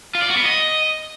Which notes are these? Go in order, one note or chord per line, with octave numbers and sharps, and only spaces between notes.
F4
D5
F#4
B3
D#5